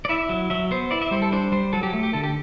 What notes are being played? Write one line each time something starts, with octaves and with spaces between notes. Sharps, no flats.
D5
E4 E5
F#3
F#3 E5
B3 C5
E4 D5
E5
G3 C5
A4
D4 C5
G3 C5
F#3 A4
G4
A3
G4
D3 A4
G4